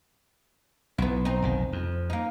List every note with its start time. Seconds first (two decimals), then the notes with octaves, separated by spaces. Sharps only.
0.98 B1 B3 E4
1.25 C4 D#4
1.42 F1 B1 D#3
1.73 F2
2.10 A#3 D#4